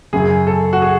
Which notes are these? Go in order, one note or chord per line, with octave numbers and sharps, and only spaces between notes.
F#2 C#3 F#3 G#4
A4
F#4
G#4